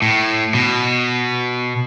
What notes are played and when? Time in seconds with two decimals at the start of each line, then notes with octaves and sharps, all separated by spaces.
0.02 A2
0.55 B2